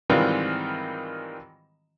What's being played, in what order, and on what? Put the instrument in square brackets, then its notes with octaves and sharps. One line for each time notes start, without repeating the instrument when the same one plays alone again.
[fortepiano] G#2 D#3 E3 G3 C4 F4